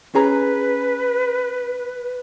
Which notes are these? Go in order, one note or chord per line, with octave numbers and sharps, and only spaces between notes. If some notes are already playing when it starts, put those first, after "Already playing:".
C#4 G#4 B4 A#5